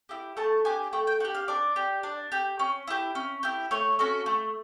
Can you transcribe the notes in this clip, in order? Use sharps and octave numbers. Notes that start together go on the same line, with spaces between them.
E4 G4
A3 A5
D4 G4 G#5
A3 G5
G5
D4 G4 F#5
F5
D4 D5
G4
D4
G4
C#4
E4 G4
C#4
E4 G4
A3 C#5
C#4 F#4 A4
A3